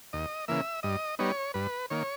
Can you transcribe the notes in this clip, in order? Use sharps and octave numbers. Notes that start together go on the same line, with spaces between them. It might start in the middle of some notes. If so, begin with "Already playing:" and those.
D#2 D#5
C#3 E3 A#3 E5
G2 D#5
G3 B3 D#4 C#5
G2 B4
D#3 A#3 C#5